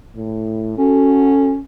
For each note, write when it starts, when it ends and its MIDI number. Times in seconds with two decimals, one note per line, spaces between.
0.15 0.75 45
0.77 1.59 61
0.77 1.54 66
0.77 1.54 69